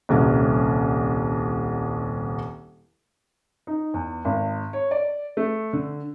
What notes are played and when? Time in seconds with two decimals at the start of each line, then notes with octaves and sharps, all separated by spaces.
0.09 D#1 C2 C#4
3.67 D#4
3.94 E2
4.25 G#1
4.73 C#5
4.91 D5
5.37 A3
5.73 D3